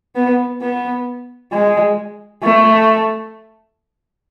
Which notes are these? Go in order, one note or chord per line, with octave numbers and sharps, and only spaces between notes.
B3
B3
G#3
A3